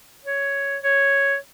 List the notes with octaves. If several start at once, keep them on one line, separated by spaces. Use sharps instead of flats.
C#5
C#5